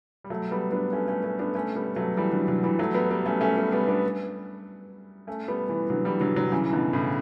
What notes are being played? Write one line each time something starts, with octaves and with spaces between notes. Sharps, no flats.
G3
F#3 A3
G3 B3
B3 D4
A3 C#4
A3 C#4
A3 C#4
B3 D4
A3 C#4
G3 B3
F#3 A3
E3 G3
D3 F#3
D3 F#3
E3 G3
F#3 A3
G3 B3
G3 B3
A3 C#4
A3 C#4
G3 B3
G3 B3
B3 D4
A3 C#4
G3 B3
E3 G3
D3 F#3
E3 G3
D3 F#3
D3 F#3
C#3 E3
B2 D3
A2 C#3